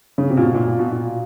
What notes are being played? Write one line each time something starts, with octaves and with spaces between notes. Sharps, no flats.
C#3
C3
A#2
B2
A#2
A#2
B2
A#2